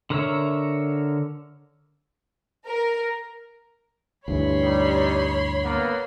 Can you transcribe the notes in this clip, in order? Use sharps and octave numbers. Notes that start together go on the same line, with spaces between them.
D3 A#4 C#5 E5
A#4
D2 G2 E3 C#5 B5 C6
G3 D#4
A#3 B3